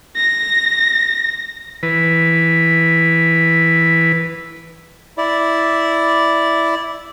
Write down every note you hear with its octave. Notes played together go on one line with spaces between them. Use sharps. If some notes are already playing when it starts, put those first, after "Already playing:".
A#6
E3 B4
E4 D5